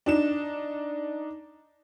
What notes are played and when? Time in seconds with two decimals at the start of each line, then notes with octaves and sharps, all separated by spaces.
0.06 D4 D#4 E7